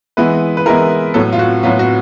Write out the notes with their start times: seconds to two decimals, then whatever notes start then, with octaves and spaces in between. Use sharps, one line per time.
0.17 E3 G#3 B3 E4 B4
0.57 B4
0.66 E3 G#3 B3 E4 A#4
1.14 A2 F#3 B3 A4
1.32 F4
1.39 F#4
1.63 A2 F#3 B3 F4
1.79 F#4